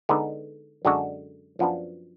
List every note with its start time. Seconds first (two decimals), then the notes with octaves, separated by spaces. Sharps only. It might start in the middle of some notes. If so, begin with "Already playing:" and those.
0.09 D3 G#3 B3 D#4
0.85 F#2 D3 G#3 D4 F#4
1.59 F#2 F3 B3 D4